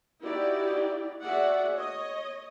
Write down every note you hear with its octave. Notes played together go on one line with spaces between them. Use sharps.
D#4 E4 F#4 G4 D5
F#4 G#4 D5 E5 F#5
C#5 D#5